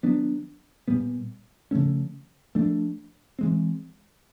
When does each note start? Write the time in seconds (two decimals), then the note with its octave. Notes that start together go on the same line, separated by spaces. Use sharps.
0.03 D#3 F#3 B3 D4
0.88 A#2 G3 B3
1.71 C#3 F3 A3 C#4
2.55 F3 A3 D4
3.39 E3 G#3 C4